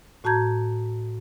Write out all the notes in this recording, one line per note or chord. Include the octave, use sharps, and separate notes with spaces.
A2 F#4 A5 A#5 G6 G#6